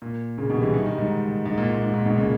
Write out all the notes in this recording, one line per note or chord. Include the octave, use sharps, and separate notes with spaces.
A#2
A#2 C#3
B2 D#3
G3
C#3 E3
D#3 G3
D#3 G3
G#2
G#2
A#2
A#2
G#2
A#2
G#2 B2
A#2 C#3